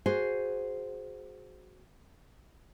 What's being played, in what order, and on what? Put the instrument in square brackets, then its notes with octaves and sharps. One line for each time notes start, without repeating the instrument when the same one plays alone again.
[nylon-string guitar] F#4 G#4 C5